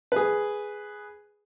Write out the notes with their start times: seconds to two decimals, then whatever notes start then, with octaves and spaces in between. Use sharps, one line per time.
0.12 G#4 B4